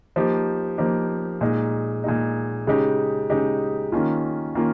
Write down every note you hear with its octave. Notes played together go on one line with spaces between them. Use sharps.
F3 A#3 D#4 G4
F3 A#3 D#4 G4
A#2 G#3 D#4
A#2 G#3 D#4
C#3 G#3 D#4 G4
C#3 G#3 D#4 G4
D#3 A#3 C#4 F4
D#3 A#3 C#4 F4